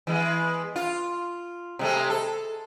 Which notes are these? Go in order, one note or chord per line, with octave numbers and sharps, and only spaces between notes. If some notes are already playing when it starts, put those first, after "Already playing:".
E3 G#3 B3
F4
C3 G#3 A3
A4